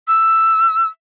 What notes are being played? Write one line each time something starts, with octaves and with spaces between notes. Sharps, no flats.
E6